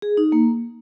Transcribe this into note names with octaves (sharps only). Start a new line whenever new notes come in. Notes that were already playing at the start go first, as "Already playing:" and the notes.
G#4
D#4
A#3